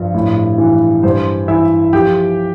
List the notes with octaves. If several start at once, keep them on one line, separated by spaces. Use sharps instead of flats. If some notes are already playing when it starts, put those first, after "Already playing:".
Already playing: G2 F3
A2
E3
G2 C5
E3 E4 E5
F3 G4 G5